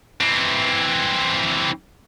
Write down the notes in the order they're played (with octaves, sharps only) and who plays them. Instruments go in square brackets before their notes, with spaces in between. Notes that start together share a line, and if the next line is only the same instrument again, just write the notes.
[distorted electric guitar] E3 C4